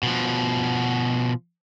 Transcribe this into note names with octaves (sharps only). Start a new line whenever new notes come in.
B2 F3